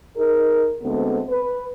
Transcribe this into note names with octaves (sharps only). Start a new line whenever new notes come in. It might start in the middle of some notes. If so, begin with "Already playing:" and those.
D#4 G#4 A#4
D2 G#3 B3 C4 A4
B4